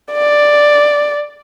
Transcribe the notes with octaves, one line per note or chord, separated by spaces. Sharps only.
D5